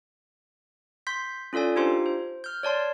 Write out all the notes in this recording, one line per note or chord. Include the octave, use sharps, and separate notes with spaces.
C6 G6 B6
C#4 F4 A4 D5 G#5
D4 D#4 F4 G4 C5 C6
C5
F6 G6
C#5 D5 A5 C6